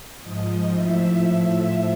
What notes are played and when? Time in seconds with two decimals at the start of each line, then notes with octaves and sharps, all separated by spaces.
0.23 G#2 F3 D#5
0.74 A2 F3 E5
1.26 A2 F3 E5